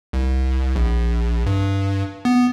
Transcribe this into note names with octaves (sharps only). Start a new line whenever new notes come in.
C2
A#1
G2
B3